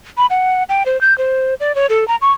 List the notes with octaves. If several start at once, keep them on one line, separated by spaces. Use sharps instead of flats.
B5
F#5
G5
C5
G6
C5
D5
C#5
A4
A#5
C#6